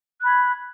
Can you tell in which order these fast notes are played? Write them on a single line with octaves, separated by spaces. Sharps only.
F#6 B5 G#6